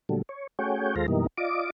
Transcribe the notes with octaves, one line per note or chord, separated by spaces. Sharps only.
A#2 D3 F#3 G3 A3
C#5
A3 C#4 F#4 G#4 C#5 G5
D#2 G#3 F4 A4 C5 A#5
F#2 B2 E3 G3 A#3 D#4
F4 D5 D#5 D6